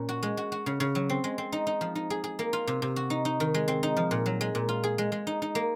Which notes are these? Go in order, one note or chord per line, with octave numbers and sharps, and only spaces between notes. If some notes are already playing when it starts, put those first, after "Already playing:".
Already playing: A#2 C#4
F#4
G#3
F#4
F#4
C#3
C#3
F#3
C4
G#3
C4
D#4
D#4
F3
D#4
G#4
G#4
A#3
F4
C3
C3
F#4
D#4
D#4
D#3
G#3
C4
D#4
F3
A#2
F#3
G#3
A#2
F4
G#4
G#3
G#3
D#4
D#4
A#3